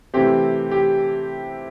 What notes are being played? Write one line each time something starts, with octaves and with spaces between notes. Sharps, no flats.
C3 E3 A3 C4 G4
G4